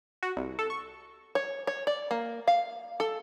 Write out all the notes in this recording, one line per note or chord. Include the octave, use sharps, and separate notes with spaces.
F#4
C2
A4
C#6
C#5
C#5
D5
A#3
F5
A4